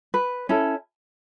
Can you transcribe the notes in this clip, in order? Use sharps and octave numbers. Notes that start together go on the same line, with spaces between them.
B4
C#4 E4 A4